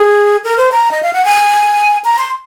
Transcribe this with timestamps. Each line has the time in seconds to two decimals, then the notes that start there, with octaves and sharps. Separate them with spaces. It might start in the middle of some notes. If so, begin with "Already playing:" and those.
Already playing: G#4
0.44 A#4
0.58 C5
0.72 A#5
0.91 D#5
1.03 F5
1.13 F#5
1.25 G#5
2.04 A#5
2.19 C6